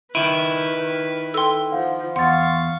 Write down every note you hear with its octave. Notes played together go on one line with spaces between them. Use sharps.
D#3 E4 B4 D7 D#7
A4 G5 C6 E6
F3 F5 F#5
E2 F5 F#5 C6 C#6 A6